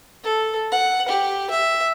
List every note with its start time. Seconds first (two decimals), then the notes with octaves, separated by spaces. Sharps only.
0.24 A4
0.72 F#5
1.09 G4
1.50 E5